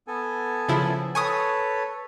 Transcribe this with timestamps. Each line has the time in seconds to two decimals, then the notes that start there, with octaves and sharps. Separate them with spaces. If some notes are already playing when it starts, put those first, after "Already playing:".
0.07 B3 A4 G#5
0.68 C#3 F3 E4
1.15 A4 B4 C#5 G#5 C#6 D#6